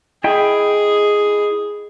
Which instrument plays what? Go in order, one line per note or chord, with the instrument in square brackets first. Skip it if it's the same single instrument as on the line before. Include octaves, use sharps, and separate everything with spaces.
[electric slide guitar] E4 D#5 G5 [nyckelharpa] G#4